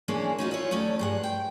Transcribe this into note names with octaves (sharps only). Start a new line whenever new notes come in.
E3 G#3 A#3 C#4 D4
C#4 D#4 F4 F#4
E4 F4 C#5
D#2 A3 C#4 D5
G2 G#3 F#5
G5